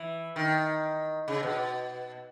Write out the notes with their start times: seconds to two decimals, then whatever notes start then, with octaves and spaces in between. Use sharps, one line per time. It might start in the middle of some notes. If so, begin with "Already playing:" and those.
Already playing: E3
0.36 D#3
1.28 C#3
1.43 B2